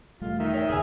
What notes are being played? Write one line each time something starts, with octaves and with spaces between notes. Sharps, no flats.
E1 G3 A3 F4
D#3 E5
C#5 E5 G5
F#1 D#2 F4 G#4 E5 G#5